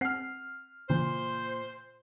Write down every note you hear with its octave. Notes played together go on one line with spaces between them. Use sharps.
C4 F#5 F6 C7
A#2 C#3 E3 C5